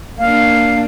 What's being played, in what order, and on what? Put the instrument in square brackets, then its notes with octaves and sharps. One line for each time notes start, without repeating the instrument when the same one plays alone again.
[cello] A#3 D4 [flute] F5